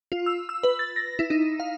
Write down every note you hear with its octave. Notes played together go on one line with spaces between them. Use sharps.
F4
E6
E6
B4
A6
A#6
E4
D#4
F5